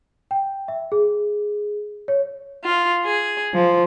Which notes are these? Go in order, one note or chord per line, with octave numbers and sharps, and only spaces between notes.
G5
E5
G#4
C#5
F4
G#4
F3